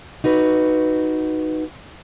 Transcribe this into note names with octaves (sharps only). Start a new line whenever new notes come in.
D#4 F#4 B4